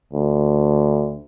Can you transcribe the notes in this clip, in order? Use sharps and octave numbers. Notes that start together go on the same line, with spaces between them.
D2